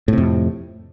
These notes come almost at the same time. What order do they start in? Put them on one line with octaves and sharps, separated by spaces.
A2 C3 F2